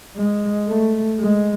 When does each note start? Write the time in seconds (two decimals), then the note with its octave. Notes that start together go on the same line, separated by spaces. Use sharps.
0.17 G#3
0.68 A3
1.20 G#3